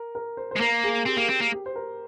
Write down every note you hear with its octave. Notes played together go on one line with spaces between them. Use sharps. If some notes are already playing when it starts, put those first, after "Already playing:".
Already playing: A#4
A#4
C5
C5
G#3
A#3 A#4
G#4
C4 G4
A#3
C4
A#3
G4
C5
A#4